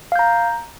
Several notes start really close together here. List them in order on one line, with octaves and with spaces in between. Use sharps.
F5 G6 A#5